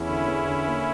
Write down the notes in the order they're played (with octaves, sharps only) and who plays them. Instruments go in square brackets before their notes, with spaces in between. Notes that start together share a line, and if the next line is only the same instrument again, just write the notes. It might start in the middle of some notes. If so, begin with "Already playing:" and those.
Already playing: [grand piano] E2 [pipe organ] C#4 E4
[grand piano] D3
E2
D3
A#3